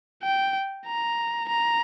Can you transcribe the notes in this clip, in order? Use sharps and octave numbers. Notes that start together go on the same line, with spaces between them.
G5
A#5
A#5